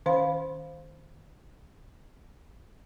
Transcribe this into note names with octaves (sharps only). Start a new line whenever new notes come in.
D#3 C#4 C5 F5 B5